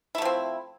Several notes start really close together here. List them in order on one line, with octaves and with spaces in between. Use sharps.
E4 A3 F3 C4